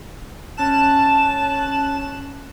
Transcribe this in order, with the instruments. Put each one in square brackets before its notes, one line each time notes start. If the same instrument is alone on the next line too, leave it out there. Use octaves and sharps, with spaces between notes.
[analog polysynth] C#4 F#6 E7 [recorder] A5